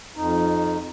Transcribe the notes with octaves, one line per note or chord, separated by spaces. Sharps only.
F2 D#4